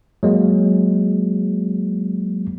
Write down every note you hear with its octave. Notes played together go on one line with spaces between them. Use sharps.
F#3 G#3 A#3